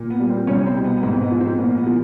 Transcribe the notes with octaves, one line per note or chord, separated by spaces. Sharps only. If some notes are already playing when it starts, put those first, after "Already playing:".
Already playing: A#2
B3
G3
C4
C2 C#4
C4
B2
B3
B3
G#2 C4
B3
F3
C4
A#2 B3
B3
F3